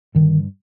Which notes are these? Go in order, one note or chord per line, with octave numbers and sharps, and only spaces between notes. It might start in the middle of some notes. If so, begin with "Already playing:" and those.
G2 D3 D#3